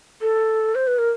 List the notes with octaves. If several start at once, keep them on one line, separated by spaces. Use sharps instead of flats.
A4
C5
B4
A#4